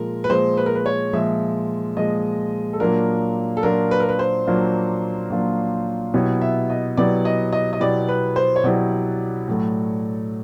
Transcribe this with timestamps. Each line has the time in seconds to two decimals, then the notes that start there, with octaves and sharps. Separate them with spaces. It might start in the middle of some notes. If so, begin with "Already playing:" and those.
Already playing: A#2 F3 G#3 A#4
0.24 B4
0.29 A#2 F3 G#3 C5
0.57 B4
0.66 A#4
0.75 B4
0.86 C#5
1.13 A#2 F3 G#3 E5
1.97 A#2 F3 G#3 D#5
2.73 A4
2.80 A#2 F#3 A#3 D4 F4 A#4
3.57 A4
3.63 A#2 F#3 A#3 D4 F4 A#4
3.91 B4
4.00 A#4
4.09 B4
4.19 C5
4.47 A#2 F#3 A#3 D4 F4
5.30 A#2 F#3 A#3 D4 F4
6.14 B2 F#3 B3 E4 G4 C#5
6.41 E5
6.70 D#5
6.97 B2 F#3 B3 E4 G4 D5
7.25 D#5
7.53 D#5
7.73 D#5
7.80 B2 F#3 B3 E4 G4 D5
8.09 B4
8.36 C5
8.56 C#5
8.64 B2 F#3 B3 E4 G4 D5
9.48 A2 F#3 A3